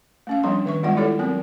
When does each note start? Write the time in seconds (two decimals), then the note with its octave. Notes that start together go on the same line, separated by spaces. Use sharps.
0.27 A3 C#4 F5
0.44 F3 G3 B3 D4 C6
0.66 D#3 E5 C#6
0.83 G3 G#3 B3 F4 D5 F#5
0.97 E4 G4 A4 C#5 E5
1.19 F#3 B3 C4 A#4